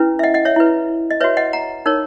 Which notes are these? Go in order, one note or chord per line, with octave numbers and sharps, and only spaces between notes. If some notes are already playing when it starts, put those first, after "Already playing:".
Already playing: C#4 E4 B4
E5
D#5 F#5
D#5 F#5
C#5 E5
E4 B4
D#5
F#4 B4 C#5 E5
D#5 F#5
F#5 A#5
D#4 A#4 C#5